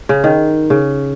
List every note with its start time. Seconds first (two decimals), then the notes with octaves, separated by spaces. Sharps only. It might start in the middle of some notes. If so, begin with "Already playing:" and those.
0.09 C#3
0.24 D#3
0.70 C#3